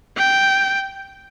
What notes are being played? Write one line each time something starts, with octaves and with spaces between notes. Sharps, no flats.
G5